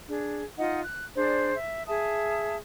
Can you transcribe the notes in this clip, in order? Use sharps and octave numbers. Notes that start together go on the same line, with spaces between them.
D4 G#4
D#4 F4 D#5 F#5
F#6
D4 G#4 C5 D5
E5
G#4 E5 A5 D#6